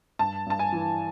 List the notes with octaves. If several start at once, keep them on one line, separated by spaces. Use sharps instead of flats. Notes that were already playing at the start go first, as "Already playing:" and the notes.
G2 A5
G2 A5
G#5
E3